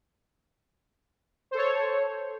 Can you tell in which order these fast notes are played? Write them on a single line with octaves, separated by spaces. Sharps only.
C5 A4 C#5